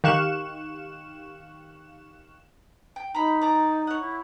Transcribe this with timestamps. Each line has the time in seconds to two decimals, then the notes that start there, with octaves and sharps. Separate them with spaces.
0.04 D#3 G4 F5 C#6 F#6 E7
2.96 G5
3.15 D#4 A#5 B5
3.42 D5 A#5
3.87 C#5 F#5
4.01 E4